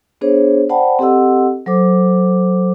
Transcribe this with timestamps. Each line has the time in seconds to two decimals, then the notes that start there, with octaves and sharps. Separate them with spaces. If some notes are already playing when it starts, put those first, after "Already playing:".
0.21 B3 D4 G#4 C5 C#5
0.69 C5 D5 F#5 G5 A5 B5
0.99 C4 G4 A4 D#5 F#5 E6
1.66 F#3 A4 C5 D6